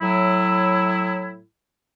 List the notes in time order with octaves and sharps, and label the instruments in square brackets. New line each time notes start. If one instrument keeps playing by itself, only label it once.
[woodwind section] A2 F#3 E4